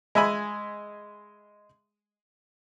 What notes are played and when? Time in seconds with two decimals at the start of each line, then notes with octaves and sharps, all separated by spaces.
0.15 G#3 E5 G#5 B5